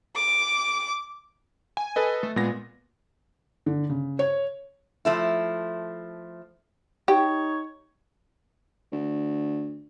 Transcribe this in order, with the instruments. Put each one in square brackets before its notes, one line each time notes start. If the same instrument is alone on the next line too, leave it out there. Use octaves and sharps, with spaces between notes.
[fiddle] D6
[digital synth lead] G#5
[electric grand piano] A4 B4 D#5
[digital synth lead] A3
[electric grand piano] A#2 B3 A#6 [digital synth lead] G#3
[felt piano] D3
C#3
C#5
[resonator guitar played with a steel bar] F3 A3 E4
[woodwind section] D#4 C#5 [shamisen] G4
[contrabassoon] D2